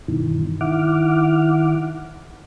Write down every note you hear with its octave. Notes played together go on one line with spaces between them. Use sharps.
G2 B2 D#3 E3
D#3 E4 F#5 D6 F6